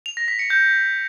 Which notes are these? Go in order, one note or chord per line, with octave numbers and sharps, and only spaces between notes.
F7
A#6
B6
C#7
G6